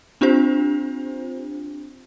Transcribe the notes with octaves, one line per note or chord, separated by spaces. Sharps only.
C4 D4 F4 G4 C5